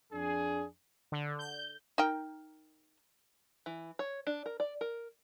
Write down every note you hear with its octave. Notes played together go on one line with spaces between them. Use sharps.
F2 D4 G#4
D3
G6
D#4 A#4 G5
E3
C#5
D4
A#4
D5
A#4